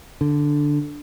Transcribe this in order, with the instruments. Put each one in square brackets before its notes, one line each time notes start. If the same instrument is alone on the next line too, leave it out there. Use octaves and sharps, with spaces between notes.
[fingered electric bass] D3